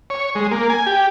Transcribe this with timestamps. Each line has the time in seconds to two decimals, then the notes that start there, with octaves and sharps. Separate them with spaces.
0.10 C#5
0.35 G#3
0.51 A#3
0.70 G#5
0.86 G4